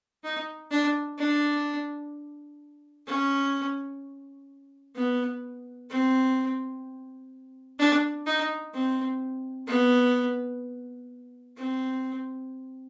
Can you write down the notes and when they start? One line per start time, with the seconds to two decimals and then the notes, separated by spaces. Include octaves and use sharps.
0.24 D#4
0.71 D4
1.18 D4
3.07 C#4
4.96 B3
5.90 C4
7.79 D4
8.27 D#4
8.74 C4
9.68 B3
11.57 C4